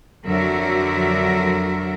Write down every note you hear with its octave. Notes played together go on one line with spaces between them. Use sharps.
F2 D3 F#3 F#4 A#4 E5